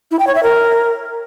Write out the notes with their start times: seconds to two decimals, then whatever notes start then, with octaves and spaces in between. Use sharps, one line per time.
0.11 E4
0.19 G5
0.27 C#5
0.35 E5
0.43 A#4